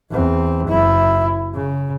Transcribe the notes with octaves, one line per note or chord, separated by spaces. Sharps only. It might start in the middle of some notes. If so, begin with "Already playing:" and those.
E2 C4
F#1 E4
C#3